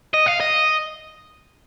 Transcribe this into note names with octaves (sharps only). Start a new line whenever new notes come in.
D#5
F5
D#5